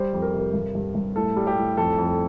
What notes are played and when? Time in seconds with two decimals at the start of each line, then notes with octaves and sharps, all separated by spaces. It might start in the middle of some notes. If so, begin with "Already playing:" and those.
Already playing: G3 C5
0.13 F2
0.22 A#4
0.33 C3
0.39 A#4
0.54 G2
0.75 G2
0.95 G2
1.16 A2 A4
1.36 G3
1.47 G4
1.58 A2
1.77 F2 A4
1.98 F2